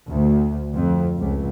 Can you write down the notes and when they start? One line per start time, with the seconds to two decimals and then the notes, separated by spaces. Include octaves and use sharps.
0.10 D2
0.74 F2
1.19 C#2